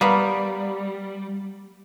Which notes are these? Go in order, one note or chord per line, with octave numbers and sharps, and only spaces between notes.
G3 A#3 B3